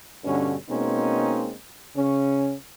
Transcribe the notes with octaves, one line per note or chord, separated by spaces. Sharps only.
G2 B2 D3 C#4
B2 G#3 A#3 C4 C#4 D#4
C#3 C#4